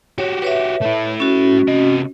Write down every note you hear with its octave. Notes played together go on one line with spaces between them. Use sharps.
F#4 G4 C#5
B4 C#5 E5
A3 E4
C#4 F#4
C3 D#5